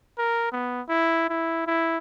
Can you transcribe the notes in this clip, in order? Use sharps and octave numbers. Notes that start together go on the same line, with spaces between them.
A#4
B3
E4
E4
E4